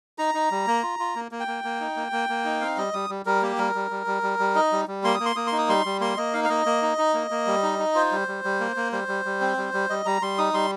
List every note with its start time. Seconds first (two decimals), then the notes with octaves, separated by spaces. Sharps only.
0.18 D#4 A#5
0.35 D#4
0.51 G3
0.67 A#3
0.83 F4
0.99 F4
1.15 A#3
1.32 A#3
1.40 G5
1.48 A#3
1.64 A#3
1.80 D#4
1.96 A#3
2.12 A#3
2.29 A#3
2.45 D#4
2.61 C4 F5
2.77 G3 D#5
2.93 G3 D#6
3.10 G3
3.26 G3 A#4
3.42 A#3 G4
3.58 G3 A#4
3.75 G3
3.91 G3
4.07 G3
4.23 G3
4.39 G3
4.55 D#4 D#5
4.72 G3
4.88 G3
5.04 A#3 C6
5.15 D#6
5.20 A#3
5.26 C6
5.36 A#3 D#6
5.47 C6
5.52 D#4
5.58 D#6
5.69 G3 C6
5.85 G3
6.01 A#3 C6
6.17 A#3 D#5
6.33 D#4 F5
6.44 F5
6.49 A#3 D#5
6.66 A#3
6.82 D#4
6.98 D#4
7.14 A#3
7.31 A#3
7.47 G3
7.63 D#4
7.79 D#4
7.95 F4 C5
8.12 G3
8.28 G3
8.44 G3
8.60 A#3
8.76 A#3
8.92 G3 C5
9.08 G3
9.25 G3
9.41 C4
9.57 G3
9.74 G3
9.90 G3 D#5
10.05 G3 A#5
10.22 G3 C6
10.38 D#4 D#6
10.54 G3 C6